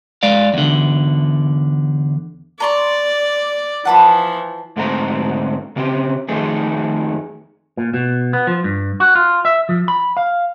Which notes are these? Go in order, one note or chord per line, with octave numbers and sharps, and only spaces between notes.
G#3 D5 F5
E2 D3
D5 A#5 C6 C#6
E3 F3 F#5 A5 B5
G#2 D3 A3 C4 A#5
C#3 C4 G4
F2 D#3 A3 G#4
A#2
B2
B3
F3
G2
F#4
F4
E5
F3
B5
F5